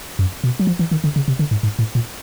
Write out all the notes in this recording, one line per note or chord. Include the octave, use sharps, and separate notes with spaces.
F#2
B2
F#3
F3
E3
D#3
D3
C#3
C3
D3
G#2
G#2
A2
A#2